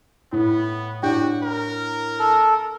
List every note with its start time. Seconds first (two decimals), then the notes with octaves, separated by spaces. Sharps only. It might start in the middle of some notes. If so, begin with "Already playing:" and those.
0.32 A2 B3
1.03 A2 D4 F#4 G4 G5
1.43 A#4
2.19 A4